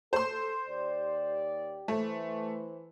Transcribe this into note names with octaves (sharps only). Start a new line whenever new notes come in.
A4 C5 C6
D#2 G4 D5
E3 A3 C5